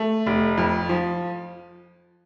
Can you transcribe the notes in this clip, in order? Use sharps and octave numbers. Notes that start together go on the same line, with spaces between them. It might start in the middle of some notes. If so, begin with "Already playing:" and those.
Already playing: A3
F1
F2
F3